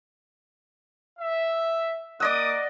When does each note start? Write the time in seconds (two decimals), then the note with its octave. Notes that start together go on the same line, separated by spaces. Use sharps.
1.19 E5
2.20 A#3 D5 D#5 F#5 D6 D#6